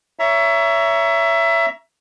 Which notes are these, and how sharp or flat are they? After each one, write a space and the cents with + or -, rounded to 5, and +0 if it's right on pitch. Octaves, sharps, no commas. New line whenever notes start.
C#5 +20 E5 +20 A#5 +20